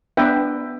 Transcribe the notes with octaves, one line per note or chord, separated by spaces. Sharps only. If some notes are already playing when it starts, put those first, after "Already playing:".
B3 D4 B4 E5 G5